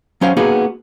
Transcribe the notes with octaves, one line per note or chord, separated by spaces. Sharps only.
F#3 C#4 C5 F5
A#3 B3 D#4 F#4 G#4